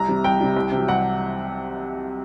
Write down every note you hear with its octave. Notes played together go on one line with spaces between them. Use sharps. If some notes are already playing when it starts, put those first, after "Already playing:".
Already playing: C2 A#5
C3 G3
C2 G5
C3 G3
C2
C3 F#3
C2 F#5